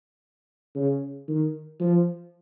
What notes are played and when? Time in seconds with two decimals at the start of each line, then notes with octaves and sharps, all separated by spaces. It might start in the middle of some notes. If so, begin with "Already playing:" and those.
0.75 C#3
1.28 D#3
1.80 F3